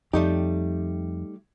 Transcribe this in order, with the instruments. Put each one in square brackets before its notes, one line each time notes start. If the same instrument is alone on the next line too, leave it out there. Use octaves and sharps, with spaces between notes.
[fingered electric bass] F2 [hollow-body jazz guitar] G3 A3 G4 [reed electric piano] D#4